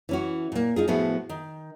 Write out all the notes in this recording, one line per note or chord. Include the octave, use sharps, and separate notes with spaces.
E3 C#4 F#4
A#2 A#3
D#4 F4 G#4
A2 F3 B3 E4 F#4 G#4
D#3